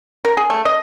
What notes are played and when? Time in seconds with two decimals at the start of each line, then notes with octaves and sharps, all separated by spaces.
0.25 A#4
0.37 G#4
0.50 A3
0.65 D#5